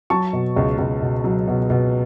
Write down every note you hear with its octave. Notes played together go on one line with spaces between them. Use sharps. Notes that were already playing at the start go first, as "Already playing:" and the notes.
F#3 A5 C#6
B2
C#2
C#2
B2
F#3
B2
B2